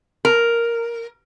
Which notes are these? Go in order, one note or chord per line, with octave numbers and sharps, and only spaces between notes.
A#4